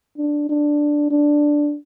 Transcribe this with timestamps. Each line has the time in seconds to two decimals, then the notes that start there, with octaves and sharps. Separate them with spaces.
0.18 D4
0.49 D4
1.11 D4